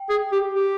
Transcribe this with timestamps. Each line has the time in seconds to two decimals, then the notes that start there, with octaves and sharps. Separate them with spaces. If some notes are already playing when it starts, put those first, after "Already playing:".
Already playing: G5
0.09 G#4
0.32 G4
0.54 G4